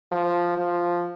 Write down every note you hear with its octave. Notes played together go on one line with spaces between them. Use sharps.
F3
F3